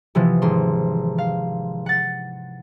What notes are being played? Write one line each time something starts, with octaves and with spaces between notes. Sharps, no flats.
C3 E3 F3 B3
G#1 C6
F5
F#5 A6